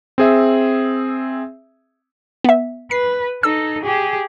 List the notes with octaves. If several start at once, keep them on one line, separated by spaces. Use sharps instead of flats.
C4 G#4 E5
B3 E5
B4 C7
D#4 A4 E6
G4 G#4